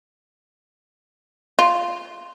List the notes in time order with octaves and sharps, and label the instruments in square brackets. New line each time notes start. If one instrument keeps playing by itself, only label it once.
[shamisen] F4